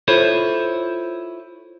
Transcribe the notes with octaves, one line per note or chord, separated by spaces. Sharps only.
E4 F4 A4 C5 C#5